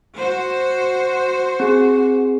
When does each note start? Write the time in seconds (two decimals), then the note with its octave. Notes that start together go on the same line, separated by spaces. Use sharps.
0.17 F#4 C5
1.60 C4 G#4